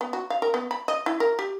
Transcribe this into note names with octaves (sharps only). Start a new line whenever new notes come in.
B3
F#4
F5
A#4
B3
B5
D#5
E4
A#4
G4